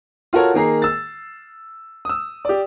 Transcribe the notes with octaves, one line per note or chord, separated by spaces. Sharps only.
F4 F#4 A4 A#4 C#5
D#3 A#3 G#4 A#5 C7
E6 A6
D#6 E6
G4 D5